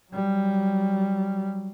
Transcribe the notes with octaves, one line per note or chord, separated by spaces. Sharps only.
F#3 G3